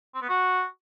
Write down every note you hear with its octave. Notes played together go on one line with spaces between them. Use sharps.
C4
B3
F#4